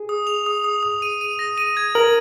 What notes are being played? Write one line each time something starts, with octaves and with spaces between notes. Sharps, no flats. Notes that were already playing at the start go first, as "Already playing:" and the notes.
Already playing: G#4
D#6
F7
D#6
D#6
D#6
D#7
D#7
A#6
D#7
G#6
A#4 F#7